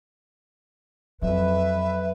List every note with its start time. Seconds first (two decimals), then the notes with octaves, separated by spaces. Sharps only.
1.22 F2 F#3 B4 E5